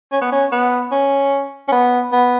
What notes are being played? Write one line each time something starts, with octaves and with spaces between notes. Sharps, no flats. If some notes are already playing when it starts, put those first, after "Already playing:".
C#4
B3
C#4
B3
C#4
C#4
B3
B3